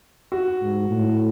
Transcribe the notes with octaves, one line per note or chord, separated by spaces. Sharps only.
F#4
G#2
A2